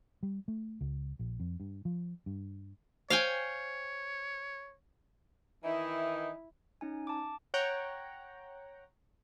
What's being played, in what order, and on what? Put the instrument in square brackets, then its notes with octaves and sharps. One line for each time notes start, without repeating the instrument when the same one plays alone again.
[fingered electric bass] G3
A3
C#2
A#1
F2
G2
F3
G2
[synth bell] C5 [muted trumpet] C#5 [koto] F5 G5 G#5
[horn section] D#3 E3 D#4 [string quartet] E4
[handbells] C#4 D#4 G#5
A5 D6
[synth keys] C#5 F#5 G5 A#5